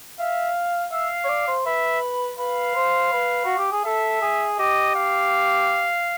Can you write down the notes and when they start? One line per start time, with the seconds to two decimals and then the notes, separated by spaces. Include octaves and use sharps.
0.19 E5 F5
0.92 E5 F5
1.25 C#5
1.29 D5
1.48 C5
1.66 B4 E5
2.38 B4 F5
2.76 C5
3.12 B4
3.45 F#4
3.58 G4
3.72 G#4
3.85 A4 E5
4.22 G#4
4.59 G4 D#5
4.96 F5